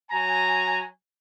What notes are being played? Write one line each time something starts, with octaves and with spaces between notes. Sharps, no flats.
F#3 G#5 A#5